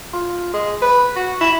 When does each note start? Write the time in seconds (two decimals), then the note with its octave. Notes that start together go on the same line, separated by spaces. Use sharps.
0.13 F4
0.54 G#3
0.82 B4
1.16 F#4
1.41 E4